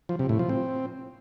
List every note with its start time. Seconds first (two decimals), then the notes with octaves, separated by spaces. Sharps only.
0.09 F3
0.19 C3
0.29 A2
0.39 F3
0.49 C4